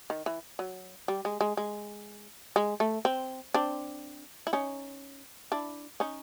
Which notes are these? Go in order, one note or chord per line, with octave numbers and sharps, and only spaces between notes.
D#3
E3
F#3
G3
G#3
G#3
G#3
G#3
A3
C4
C4 D4
E4
C#4 D#4
D4 E4
C#4 D#4